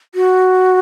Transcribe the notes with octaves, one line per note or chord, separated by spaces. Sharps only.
F#4